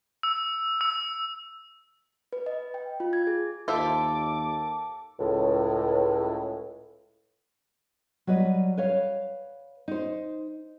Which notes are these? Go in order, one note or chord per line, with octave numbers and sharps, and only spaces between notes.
E6
E6
B4
D#5
G5
F4
G#6
G#4
D#2 F4 A4 C5 E5 D6
C#2 A2
F#3 G3 B4 D#5
B4 C#5 F5
D#4 C5